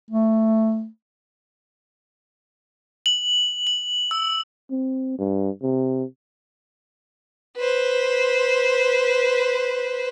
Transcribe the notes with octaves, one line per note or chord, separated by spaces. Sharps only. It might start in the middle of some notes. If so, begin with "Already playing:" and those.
A3
F#7
F#7
E6
C4
G2
C3
B4 C5